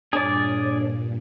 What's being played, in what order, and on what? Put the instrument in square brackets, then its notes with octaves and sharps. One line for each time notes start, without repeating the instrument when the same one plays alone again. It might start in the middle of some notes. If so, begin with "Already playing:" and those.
[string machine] G2 A#2 [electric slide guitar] D4 C#5 [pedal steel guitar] G#4 D5